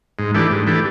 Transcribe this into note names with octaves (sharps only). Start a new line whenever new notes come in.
G#2
E3 A3 D4 G4
G#2
E3 A3 D4 G4